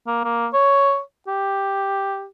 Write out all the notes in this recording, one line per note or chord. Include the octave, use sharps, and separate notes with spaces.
A#3
A#3
C#5
G4